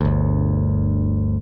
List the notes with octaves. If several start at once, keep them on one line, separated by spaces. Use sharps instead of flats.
G1 D2